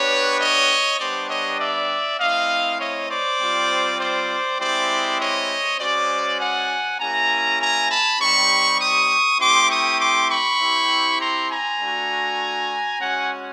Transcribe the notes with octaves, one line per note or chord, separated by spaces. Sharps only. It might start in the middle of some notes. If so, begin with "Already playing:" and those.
Already playing: B3 D4 G4 B4 C#5
C#5 D#5
G3 B3 D4 G4 C5 D5
C#5 D#5
D5 E5
A3 C4 E4 D#5 F5
C#5 D#5
C5 D5
G3 C4 F4
C5 D5
G#3 C4 E4 G4 C5 D5
C#5 D#5
G#3 C#4 F#4 C5 D5
F#5 G#5
A#3 C#4 E4 G4 G#5 A#5
G#5 A#5
A5 B5
G3 C4 D#4 G4 B5 C#6
C#6 D#6
A3 C4 E4 G4 C6 D6
C#6 D#6
C6 D6
B5 C#6
C4 E4 G4
A#5 C6
G#5 A#5
A3 D4 F#4
G#3 C#4 F#4 F#5 G#5